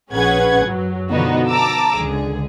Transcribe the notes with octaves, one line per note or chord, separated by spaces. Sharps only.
A#1 C#4 G#4 B4 F#5 G#6
F#2 F#3
B2 D3 F3 B3 D#4 F#4
A5 A#5 D6 E6
C#2 D3 G#4